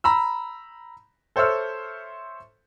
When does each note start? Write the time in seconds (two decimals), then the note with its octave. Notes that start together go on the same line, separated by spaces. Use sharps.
0.04 A#5 B5 E6
1.36 A4 C5 C#5 E5 E6 F6